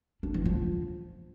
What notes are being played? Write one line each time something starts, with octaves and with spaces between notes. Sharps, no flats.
D4
E3
F3